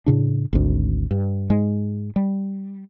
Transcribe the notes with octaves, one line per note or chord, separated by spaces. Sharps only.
A2 C#3 D4
G#1 D2
G2
G#2 G#3
G3